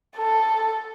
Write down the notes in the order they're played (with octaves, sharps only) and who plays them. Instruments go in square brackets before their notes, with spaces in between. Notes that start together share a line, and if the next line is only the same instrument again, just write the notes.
[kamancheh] A4